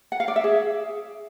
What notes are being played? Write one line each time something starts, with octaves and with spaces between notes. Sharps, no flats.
F#5
F5
D5
E5
G#4